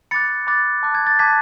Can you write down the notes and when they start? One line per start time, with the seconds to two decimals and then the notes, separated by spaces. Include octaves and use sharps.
0.11 B5 D6 F#6 A6 C#7
0.47 B5 D6 F#6 A6
0.83 A5 D6 F#6
0.95 G#6
1.07 A6
1.19 A5 D6 F#6 G#6 B6